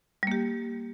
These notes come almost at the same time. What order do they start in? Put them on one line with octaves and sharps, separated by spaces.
G3 A#3 G4